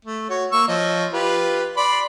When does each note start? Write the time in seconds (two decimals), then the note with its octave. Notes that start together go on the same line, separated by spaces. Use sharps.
0.05 A3
0.30 F#4 C#5
0.52 A#3 C#6 E6
0.68 F3 C#5 D#5
1.13 F4 G4 B4
1.77 D5 B5 C6